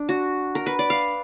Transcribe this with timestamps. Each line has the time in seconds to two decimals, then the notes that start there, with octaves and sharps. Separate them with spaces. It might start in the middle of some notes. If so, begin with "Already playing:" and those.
Already playing: D4
0.09 F#4
0.55 A#4
0.66 B4
0.79 D5
0.90 F5